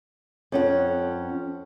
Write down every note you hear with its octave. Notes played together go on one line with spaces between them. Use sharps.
F2 C#4 F#5